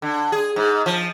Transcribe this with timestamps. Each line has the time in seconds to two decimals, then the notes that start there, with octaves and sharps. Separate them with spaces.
0.02 D3
0.32 G#4
0.56 G#2
0.86 F3